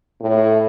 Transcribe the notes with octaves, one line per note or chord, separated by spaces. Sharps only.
A2